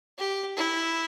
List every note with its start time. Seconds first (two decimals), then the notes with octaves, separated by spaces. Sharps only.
0.18 G4
0.56 E4